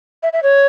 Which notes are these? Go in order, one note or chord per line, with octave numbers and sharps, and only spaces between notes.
E5
E5
C#5